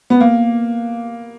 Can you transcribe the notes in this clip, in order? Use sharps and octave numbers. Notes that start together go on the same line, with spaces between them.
B3
A#3